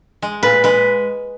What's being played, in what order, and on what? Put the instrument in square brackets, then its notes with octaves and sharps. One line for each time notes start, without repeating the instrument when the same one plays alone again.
[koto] G#3
A#2 B4
G#3 B4